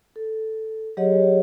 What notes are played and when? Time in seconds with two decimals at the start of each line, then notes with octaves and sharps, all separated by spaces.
0.16 A4
0.97 F#3 G4 G#4 C#5 D#5 F#5